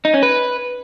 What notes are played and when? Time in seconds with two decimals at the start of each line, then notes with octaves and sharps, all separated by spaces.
0.05 D#4
0.14 C#4
0.23 B4